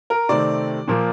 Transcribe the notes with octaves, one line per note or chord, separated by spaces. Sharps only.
A#4
C3 D#3 A3 C4 D5
A#2 F3 A#3